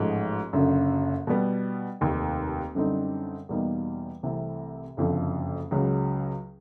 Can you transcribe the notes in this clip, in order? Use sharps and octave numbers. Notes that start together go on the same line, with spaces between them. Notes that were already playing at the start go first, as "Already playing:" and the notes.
Already playing: A1 G#2 F3 A3
F#1 F#2 D3
B2 G3 B3
F1 D#2 D#3
F#2 D3 G3 C4 D#4
E2 B2 G3 A#3 D#4
C2 C3 E3 A3
F#1 F2 D3 F3
C#2 C#3 F#3